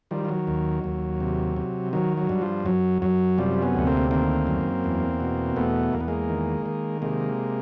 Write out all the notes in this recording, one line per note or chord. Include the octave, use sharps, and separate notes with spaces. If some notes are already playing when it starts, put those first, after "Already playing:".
D#3 F3 G3
F3
F#3
D#2
D#2
C3
C3
D#3 F#3
F#3
G2
F3
F#2 F#3
F#2 F#3
C3 F3 G3
B3 C#4
D2
A#3 C4
D#3 A#3 C4
F#2
E2
B2
E2 A3 B3
E2 A#3
B3
G#3 A#3
D#3
D#3
C3 G#3 A#3